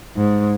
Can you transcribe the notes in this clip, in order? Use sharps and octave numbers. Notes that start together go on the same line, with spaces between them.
G#2